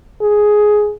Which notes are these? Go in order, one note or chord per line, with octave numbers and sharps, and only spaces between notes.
G#4